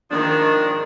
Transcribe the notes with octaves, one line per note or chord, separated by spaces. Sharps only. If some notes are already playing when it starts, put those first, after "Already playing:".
G#2 D#3 F3 D4